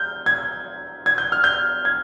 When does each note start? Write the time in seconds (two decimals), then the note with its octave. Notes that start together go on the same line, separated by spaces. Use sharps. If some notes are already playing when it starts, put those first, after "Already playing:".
Already playing: F6 G6
0.26 G#6
1.06 G#6
1.18 G6
1.32 F6
1.44 G6
1.85 G#6